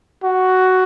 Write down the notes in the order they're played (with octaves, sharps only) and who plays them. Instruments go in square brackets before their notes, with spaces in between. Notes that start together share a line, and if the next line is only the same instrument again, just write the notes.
[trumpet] F#4